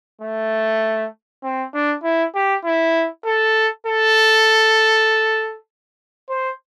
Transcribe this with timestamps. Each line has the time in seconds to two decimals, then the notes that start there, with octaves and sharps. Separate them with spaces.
0.22 A3
1.43 C4
1.74 D4
2.04 E4
2.35 G4
2.65 E4
3.25 A4
3.87 A4
6.29 C5